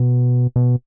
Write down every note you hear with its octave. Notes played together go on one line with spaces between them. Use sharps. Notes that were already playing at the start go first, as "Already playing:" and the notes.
Already playing: B2
B2